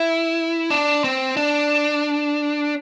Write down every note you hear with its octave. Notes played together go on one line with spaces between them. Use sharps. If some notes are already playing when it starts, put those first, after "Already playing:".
Already playing: E4
D4
C4
D4